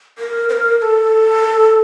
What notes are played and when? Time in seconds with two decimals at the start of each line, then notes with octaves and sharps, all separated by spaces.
0.18 A#4
0.49 C5
0.52 A#4
0.78 A#4
0.82 A4